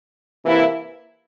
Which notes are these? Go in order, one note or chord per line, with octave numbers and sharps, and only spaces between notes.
C3 E3 A#3 E4